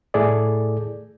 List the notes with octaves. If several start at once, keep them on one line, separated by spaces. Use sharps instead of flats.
A2 A3 E4 G#4 A4 D5